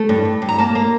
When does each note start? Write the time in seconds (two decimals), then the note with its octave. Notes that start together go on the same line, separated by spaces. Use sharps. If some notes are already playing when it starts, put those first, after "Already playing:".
Already playing: A3
0.09 G2
0.25 G2
0.42 G2
0.49 A#5
0.58 A#3 A5
0.75 A#3 A#5